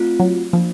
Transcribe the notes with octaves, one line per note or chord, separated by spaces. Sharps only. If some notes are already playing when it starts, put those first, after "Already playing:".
Already playing: A3 C4 F4
F#3
F3 A#3 D4 F4